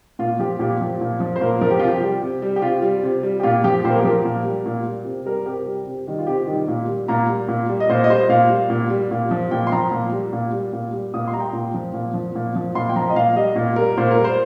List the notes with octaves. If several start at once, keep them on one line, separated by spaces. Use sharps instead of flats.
A#2 F4
F3 G4
A#2 G4
F3
A#2
F3
C5
A#2 A#4
F3 A#4
G4
C3 F4
G4
G3
C3
G3
G4
C3 F4
G3
C3
G3
G4
A#2 F4
F3 G4
A#2 C5
A#4
G4
F3 A#4
A#2
G3
A#2
G3
C3
G3 A#4
C3 G4
G3
C3
D#3 G3
F4
C3 G4
D#3 G3
A#2
G3
A#2 A#5
G3
A#2
G3
D#5
A#2 C5
D#5
G3 C5
A#2 F5
G3
A#2
G3
A#2
F3
A#2 G5
C6
F3 A#5
A#2
G3
A#2
G3
A#2
G3
A#2 D#6
C6
G3 A#5
G5
A#2
F3
A#2
F3
A#2
F3
A#2 C6
G5
F3 A#5
D#5
A#2 F5
G3 D#5
A#2
G3 A#4
A#2 C5
A#4
G3
C5